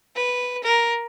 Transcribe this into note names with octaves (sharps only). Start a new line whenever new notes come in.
B4
A#4